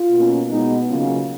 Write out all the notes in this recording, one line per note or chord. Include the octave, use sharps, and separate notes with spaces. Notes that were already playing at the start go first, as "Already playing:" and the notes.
Already playing: F4
B2 A#3 C#4
B2 G#3 B3 D#4
C#3 F#3 A#3 C#4 F4